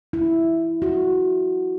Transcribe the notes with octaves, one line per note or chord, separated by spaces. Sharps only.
E4
F#4